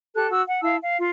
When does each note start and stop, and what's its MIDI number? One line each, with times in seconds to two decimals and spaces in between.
0.15 0.30 67
0.15 0.30 69
0.15 0.30 90
0.30 0.42 66
0.30 0.42 88
0.47 0.62 78
0.63 0.77 64
0.63 0.77 77
0.63 0.77 81
0.63 0.77 88
0.83 0.97 77
0.99 1.10 65